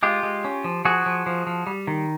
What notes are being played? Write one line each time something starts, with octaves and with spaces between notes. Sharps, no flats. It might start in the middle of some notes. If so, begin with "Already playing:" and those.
G#3 F4 G4
G#3
C#4
F3
F3 F#4 G#4
F3
F3
F3
G3
D#3